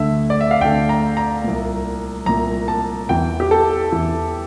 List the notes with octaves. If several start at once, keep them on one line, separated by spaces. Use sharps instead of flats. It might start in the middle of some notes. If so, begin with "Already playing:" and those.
Already playing: D2 D3 E5
D5
E5
F5
D2 D3 G5
A#5
A#5
C2 A#2
C2 A#2 A#5
A5
E2 E3 G5
G4
A4
E2 E3